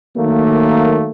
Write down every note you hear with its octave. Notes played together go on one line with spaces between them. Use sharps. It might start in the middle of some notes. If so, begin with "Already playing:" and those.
D#3 F#3 A3 A#3